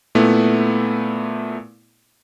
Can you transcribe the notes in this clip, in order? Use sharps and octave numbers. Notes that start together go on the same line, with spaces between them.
A#2 A3 B3 E4